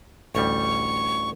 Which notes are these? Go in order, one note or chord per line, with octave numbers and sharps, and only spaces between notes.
A1 D2 G3 C#6